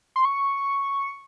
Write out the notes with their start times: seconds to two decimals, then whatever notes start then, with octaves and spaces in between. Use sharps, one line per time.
0.16 C6
0.25 C#6